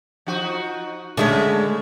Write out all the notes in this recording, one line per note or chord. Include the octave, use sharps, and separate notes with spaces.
F3 D#4 F#4
D3 G#3 A3 C#4 D#4 E5